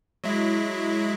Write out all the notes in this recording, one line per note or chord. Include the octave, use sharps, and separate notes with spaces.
F#3 G#3 E4